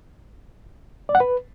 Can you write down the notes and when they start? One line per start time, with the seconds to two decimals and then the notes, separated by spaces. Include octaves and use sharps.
1.09 D5
1.15 F#5
1.20 B4